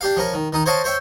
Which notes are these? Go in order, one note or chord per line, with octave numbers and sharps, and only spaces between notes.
D4 G4 F5
F3 C#4 A#4
D#3
D#3 D#4 D#6
C5 C#5 D#5 F5 A5
C5 C#5 E5 G5